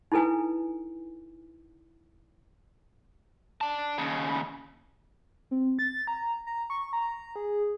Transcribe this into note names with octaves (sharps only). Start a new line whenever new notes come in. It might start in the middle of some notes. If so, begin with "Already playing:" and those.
D#4 E4 A4 B4 G#5
D5 A5
D#2 C#3
C4
A6
A#5
A#5
C#6
A#5
G#4